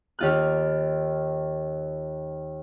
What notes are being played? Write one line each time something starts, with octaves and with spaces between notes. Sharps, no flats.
D#2 F4 F#6